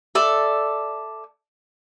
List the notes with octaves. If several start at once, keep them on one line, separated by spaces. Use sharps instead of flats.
A4 D5 E5